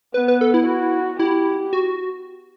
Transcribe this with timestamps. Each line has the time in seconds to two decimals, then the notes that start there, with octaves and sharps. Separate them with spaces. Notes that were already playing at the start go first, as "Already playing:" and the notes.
0.14 B3 B4
0.28 B4
0.41 A4
0.54 E4
0.67 F#4
1.19 E4 G4
1.73 F#4